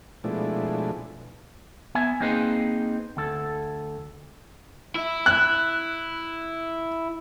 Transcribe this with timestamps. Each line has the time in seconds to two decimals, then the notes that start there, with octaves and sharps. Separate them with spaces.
0.24 B2 F3 G#3 A3 D4 E4
1.95 B3 E5 G#5
2.20 A#3 C4 D#4 G#4 B4 C5
3.17 D2 A4
4.96 E4
5.26 F#6